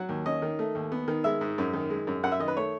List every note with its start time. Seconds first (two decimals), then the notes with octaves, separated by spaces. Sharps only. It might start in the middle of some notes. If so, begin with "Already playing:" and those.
Already playing: F#3 F#5
0.09 D#2
0.26 C#4 D#5
0.42 D#3
0.59 A3
0.75 D#2
0.92 B3
1.08 D#3
1.24 G#3 E5
1.41 G#2
1.58 F#2
1.74 D#3
1.90 G#3
2.07 F#2
2.23 F#2 F#5
2.32 E5
2.39 D#3 D#5
2.48 B4
2.57 A3 C#5